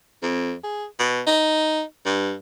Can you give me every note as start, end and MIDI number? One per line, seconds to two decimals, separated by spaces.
0.22 0.54 41
0.64 0.86 68
0.99 1.21 47
1.27 1.82 63
2.05 2.34 43